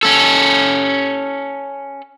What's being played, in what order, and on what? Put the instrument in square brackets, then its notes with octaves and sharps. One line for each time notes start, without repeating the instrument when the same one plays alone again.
[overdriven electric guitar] C#4 A4